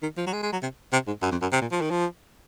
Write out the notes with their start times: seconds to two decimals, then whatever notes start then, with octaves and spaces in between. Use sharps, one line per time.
0.03 D#3
0.17 F3
0.27 F#3
0.33 G#3
0.43 G#3
0.53 F#3
0.62 C3
0.93 C3
1.07 G#2
1.22 F#2
1.32 F2
1.42 F#2
1.52 C3
1.62 A#2
1.72 F3
1.81 D#3
1.91 F3